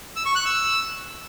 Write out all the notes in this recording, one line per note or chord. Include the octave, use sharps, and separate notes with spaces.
E6
C#6
F#6
E6